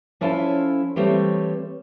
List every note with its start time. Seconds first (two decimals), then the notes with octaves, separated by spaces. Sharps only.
0.21 F3 C#4 E4 F4 A4 C#5
0.96 E3 G3 A3 C4 C#5